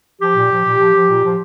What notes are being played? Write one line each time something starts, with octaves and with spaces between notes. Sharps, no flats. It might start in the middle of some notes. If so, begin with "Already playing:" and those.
F3 G4
A#2
F3
A#2
F3
F3
A#2
F3